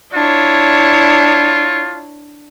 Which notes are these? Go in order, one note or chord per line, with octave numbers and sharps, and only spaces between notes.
D4 E4 F4 C#5